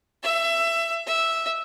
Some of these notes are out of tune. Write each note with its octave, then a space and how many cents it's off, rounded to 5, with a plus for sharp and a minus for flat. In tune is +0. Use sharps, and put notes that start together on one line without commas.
E5 +20
E5 -5